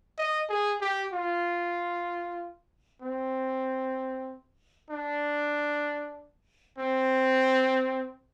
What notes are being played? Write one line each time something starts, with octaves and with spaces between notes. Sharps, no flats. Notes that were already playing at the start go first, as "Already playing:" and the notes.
D#5
G#4
G4
F4
C4
D4
C4